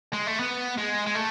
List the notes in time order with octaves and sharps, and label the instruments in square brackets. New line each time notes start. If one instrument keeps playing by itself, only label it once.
[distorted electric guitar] G#3
A3
B3
G#3
G#3
A3